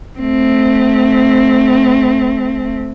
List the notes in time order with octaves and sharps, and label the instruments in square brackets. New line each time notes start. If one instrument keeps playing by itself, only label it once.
[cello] A3 C4